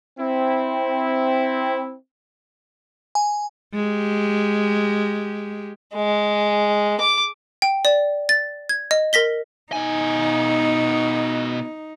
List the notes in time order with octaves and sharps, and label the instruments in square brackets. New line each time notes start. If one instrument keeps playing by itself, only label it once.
[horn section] C4 E4
[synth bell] G#5
[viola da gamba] G#3 G4
[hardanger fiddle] G#3
D6
[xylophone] G5
D5
A6
G#6
D#5
A#4 A#6 B6 G7
[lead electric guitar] B2 G#5 [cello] D#4